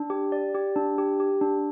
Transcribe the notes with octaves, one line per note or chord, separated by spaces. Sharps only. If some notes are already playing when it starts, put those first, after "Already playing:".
Already playing: D4
G4
D5
G4
D4
G4
G4
D4